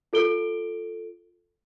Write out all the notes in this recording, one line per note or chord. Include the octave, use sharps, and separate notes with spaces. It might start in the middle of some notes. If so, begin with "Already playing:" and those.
F4 A4 D7 G7